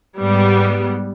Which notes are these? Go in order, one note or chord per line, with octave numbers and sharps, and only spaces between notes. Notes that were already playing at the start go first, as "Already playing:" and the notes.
G#2 G3 B3